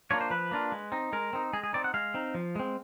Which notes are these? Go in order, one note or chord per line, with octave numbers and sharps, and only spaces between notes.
A#3 D4 F4 C#5
C5
F3 B4
A#3 D4 F4
G#3
C4 D#4
G#3 A#4
C4 D#4
G#3 G#4
G#4
C4 D#4 D5
F#5
G#3 F5
C4 D#4
F3
G#3 C4